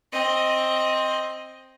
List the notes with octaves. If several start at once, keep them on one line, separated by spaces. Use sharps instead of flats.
C4 D#5